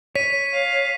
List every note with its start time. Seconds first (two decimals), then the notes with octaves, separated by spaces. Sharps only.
0.15 C#5 B6 D#7
0.53 F5